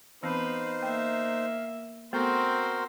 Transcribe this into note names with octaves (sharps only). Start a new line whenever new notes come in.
E3 B3 C4 D#4 B4 C5 F5
A#3 E5 G5
A3 B3 C4 F#4 A4 A#4 C5 G6